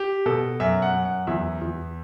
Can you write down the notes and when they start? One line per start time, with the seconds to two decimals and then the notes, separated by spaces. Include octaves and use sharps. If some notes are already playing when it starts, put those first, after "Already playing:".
Already playing: G4
0.26 B2 A4
0.60 F#2 E5
0.82 F#5
0.94 F#2
1.05 F#5
1.27 E2 E5
1.62 E2